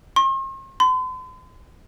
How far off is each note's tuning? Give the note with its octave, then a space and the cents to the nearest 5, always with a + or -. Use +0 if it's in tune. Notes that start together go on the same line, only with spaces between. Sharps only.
C6 +45
C6 -45